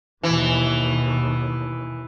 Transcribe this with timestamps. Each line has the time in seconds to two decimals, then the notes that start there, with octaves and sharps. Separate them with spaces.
0.23 D#2 B2 E3